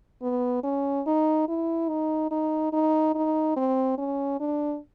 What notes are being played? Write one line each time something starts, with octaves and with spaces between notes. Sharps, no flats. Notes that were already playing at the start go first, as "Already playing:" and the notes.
B3
C#4
D#4
E4
D#4
D#4
D#4
D#4
C4
C#4
D4